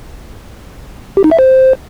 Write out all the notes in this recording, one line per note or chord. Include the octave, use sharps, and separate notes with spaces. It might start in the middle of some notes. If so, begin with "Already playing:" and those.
G4
D#4
E5
C5